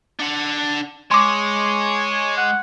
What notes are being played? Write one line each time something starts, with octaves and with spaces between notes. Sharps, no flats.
D4 F#5
G#3 C#5 C6 D6
F#5